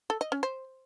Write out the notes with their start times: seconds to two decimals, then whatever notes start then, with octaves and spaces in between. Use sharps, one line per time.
0.10 A4
0.21 D#5
0.32 C#4
0.43 C5